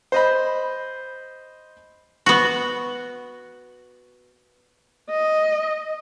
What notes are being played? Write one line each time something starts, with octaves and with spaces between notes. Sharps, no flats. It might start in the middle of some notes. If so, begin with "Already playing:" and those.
C5 D#5 B5
B3 F#4
D#5